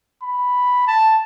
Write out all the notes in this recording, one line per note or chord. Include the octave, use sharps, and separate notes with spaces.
B5
A5